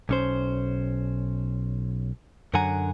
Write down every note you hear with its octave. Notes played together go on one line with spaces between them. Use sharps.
B1 C#4 C5
F#2 D3 F#3 F#5 G#5 A#5